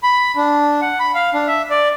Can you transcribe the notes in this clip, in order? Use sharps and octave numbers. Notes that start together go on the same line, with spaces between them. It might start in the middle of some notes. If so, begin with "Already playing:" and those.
B5
D4
F#5
B5
F5
D4
E5
D5